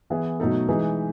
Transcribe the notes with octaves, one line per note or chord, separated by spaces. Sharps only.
E3 B3 E4 G#4
B2 F#3 A3 D#4 A4
E3 G#3 D#4 G#4 B4